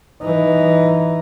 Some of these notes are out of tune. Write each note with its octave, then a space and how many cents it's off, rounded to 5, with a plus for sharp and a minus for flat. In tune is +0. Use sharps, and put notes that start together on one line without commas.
E3 +0 D#4 +0